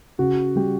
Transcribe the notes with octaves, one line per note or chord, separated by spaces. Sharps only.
C#3 F#4
G3 G4